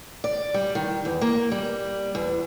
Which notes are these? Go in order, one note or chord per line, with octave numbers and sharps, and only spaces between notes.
D5
G3
D#3
E2
A#3
G3
E2